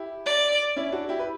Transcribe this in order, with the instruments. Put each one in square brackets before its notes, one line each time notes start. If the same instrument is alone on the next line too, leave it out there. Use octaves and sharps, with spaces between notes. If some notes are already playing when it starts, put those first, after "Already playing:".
Already playing: [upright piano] E4 G4
[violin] D5
[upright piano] C#4 E4
D4 F#4
E4 G4
B4